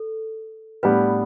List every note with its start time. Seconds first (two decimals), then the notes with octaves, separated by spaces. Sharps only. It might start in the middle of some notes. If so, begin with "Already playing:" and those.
Already playing: A4
0.83 A2 G3 B3 D4 G4 B4